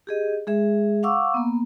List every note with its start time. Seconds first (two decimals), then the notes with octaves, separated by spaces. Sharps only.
0.07 G4 G#4 D#5
0.47 G#3 G#4 E5
1.03 F5 F#5 C#6 D6 E6
1.34 A#3 B3